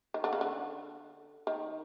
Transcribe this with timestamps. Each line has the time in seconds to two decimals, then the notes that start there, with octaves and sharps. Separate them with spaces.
0.14 D#3
0.24 D3
0.33 C#3
0.41 D3
1.47 D#3